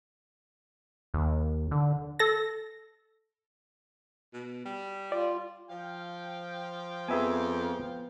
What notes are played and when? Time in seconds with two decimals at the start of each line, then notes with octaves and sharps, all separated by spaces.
1.14 D#2
1.71 D3
2.19 A4 A#6
4.33 B2
4.65 G3
5.12 F4 D5
5.70 F3 F5 G5
7.08 F2 B3 G#4 B4 E5 G#5